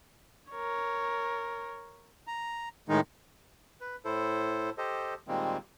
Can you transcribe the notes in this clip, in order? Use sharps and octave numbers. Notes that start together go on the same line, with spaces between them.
A#4 C#5
A#5
A2 D#3 G#3 D#4
B4
A2 E4 A4 C5
G4 A4 C5 D#5
A#2 D#3 G3 G#3 A#3 C4